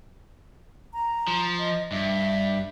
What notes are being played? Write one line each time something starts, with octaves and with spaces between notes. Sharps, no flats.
A#5
F3
D#5
G2 E5